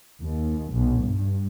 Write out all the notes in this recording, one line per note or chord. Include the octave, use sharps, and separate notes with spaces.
D#2
B1
G2